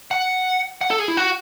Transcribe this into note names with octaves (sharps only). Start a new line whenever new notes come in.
F#5
F#5
A4
G#4
E4
F#4